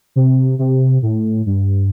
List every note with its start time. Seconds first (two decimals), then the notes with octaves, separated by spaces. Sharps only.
0.16 C3
0.59 C3
1.03 A2
1.46 G2